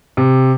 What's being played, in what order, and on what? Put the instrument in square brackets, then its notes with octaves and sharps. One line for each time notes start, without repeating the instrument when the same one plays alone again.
[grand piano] C3